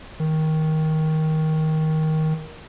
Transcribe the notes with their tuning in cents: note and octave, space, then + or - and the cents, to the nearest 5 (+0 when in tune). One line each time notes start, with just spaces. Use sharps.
D#3 +15